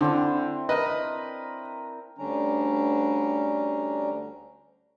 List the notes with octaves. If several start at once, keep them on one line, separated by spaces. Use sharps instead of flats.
D3 C4 D4 E4
A#4 B4 D#5 A#5
D2 D3 G3 C#4 D4 A#5